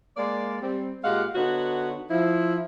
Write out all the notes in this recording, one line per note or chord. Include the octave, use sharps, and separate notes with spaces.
G#3 A#3 D5
G3 C4
A#2 G#3 G4 F5 F#5
D3 B3 D#4 F#4 C#5
F3 E4